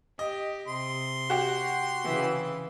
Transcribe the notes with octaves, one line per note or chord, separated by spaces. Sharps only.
G4 D#5
C3 C6
F#4 G4
C#3 E3